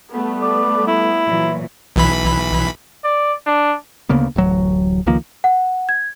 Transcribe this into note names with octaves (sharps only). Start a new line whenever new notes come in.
G3 A3 B3
D5
E4
A#2 E3 F#3
B1 E3 B5
D5
D4
D2 C#3 A#3 B3
D1 A1 F#3
C#2 D#3 F3 A#3
F#5
G#6